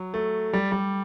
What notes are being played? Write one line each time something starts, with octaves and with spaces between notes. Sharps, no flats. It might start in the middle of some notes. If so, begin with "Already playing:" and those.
Already playing: F#3
A3
G3
G3